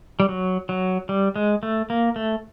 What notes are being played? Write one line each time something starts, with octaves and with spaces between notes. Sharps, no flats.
G3
F#3
F#3
G3
G#3
A3
A#3
A3